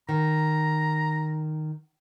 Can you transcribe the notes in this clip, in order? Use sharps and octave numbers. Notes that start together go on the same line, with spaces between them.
D#3 A#5